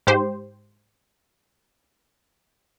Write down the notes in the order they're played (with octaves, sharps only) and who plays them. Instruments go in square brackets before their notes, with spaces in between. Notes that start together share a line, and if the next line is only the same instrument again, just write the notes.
[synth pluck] G#2 G4 C5